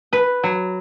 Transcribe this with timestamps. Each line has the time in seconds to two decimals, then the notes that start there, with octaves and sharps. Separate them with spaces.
0.13 B4
0.43 F#3